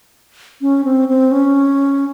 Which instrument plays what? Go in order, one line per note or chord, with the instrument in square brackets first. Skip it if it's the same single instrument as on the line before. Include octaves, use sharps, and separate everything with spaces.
[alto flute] C#4
C4
C4
C#4